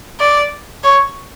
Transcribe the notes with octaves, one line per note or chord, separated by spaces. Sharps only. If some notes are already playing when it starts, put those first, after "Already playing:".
D5
C#5